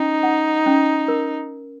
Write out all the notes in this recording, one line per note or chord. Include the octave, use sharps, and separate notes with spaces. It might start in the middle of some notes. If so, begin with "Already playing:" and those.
Already playing: C#4 D#4
F#5
C#4
A#4